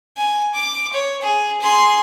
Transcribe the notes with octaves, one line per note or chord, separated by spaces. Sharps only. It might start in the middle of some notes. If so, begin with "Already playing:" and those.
G#5
D6
C#5
G#4
G#4 C6